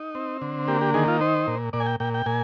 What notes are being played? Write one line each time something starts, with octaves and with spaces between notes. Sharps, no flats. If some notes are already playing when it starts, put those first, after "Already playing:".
Already playing: D#4
C4
D3
A#3 G4
G4
D#3 G#4
F4
D#4 C5
A#2
A#2 D5
G#5
G5
A#2 G5
G5
A#2 G#5